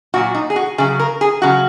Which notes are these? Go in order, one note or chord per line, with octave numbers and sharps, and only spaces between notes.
A#2 F#3 F#4
D#4
G#4
F#4
C#3 F#3 G#4
A#4
G#4
C#3 F#3 F#4